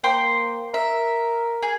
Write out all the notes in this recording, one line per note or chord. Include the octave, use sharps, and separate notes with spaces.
A#3 C5 G5 C6
A#4 E5
G#4